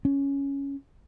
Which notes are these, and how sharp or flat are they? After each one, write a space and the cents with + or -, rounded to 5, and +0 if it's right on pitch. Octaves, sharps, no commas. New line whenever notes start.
C#4 +5